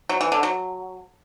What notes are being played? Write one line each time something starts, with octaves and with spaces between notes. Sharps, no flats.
F#3
E3
D3
F#3